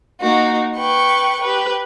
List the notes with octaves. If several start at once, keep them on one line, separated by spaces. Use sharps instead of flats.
A#3 D#4 F#4
B4 G5 C#6
G4 B4